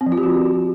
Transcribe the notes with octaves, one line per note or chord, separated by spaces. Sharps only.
C4
F3
F4
G4
F#4